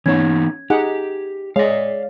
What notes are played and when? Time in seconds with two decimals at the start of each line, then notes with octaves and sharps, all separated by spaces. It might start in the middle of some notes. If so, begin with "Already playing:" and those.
0.06 E3 B3 C#4 D#4 C#5 G#6
0.70 D#4 G4 G#4 F#5
1.56 G#3 C#5 D5 F5